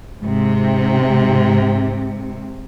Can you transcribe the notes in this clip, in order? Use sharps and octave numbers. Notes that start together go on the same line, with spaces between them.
G#2 C3